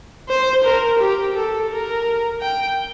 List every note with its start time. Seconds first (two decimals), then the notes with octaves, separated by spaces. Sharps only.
0.29 C5
0.64 A#4
0.99 G4
1.35 A4
1.70 A#4
2.41 G5